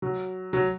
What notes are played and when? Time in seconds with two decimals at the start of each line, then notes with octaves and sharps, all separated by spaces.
0.02 F#3
0.53 F#3